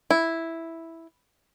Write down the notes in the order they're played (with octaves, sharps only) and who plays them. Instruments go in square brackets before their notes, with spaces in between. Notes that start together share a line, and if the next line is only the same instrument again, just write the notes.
[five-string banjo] E4